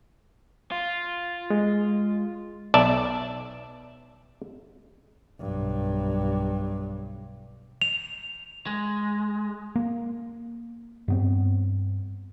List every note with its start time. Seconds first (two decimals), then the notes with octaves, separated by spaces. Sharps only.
0.71 F4
1.50 G#3
2.74 B1 D5 E5 A5
5.39 B1 G2
7.82 F7
8.67 G#3
9.76 A#3
11.08 G2 B3 C4